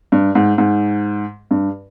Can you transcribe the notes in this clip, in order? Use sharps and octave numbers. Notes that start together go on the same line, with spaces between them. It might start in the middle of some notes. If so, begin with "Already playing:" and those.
G2
G#2
G#2
G2